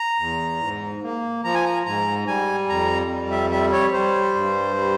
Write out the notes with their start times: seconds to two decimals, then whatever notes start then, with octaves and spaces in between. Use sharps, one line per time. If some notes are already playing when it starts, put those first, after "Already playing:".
Already playing: A#5
0.19 E2
0.61 G#2
1.03 A#3
1.44 F3 A#5
1.54 G#5
1.65 A#5
1.86 G#2 A#5
2.27 G3 G#5
2.68 F2 A#5
3.11 G3
3.31 E5
3.51 G3 E5
3.72 C#5
3.93 G3 C5
4.35 G2
4.76 G3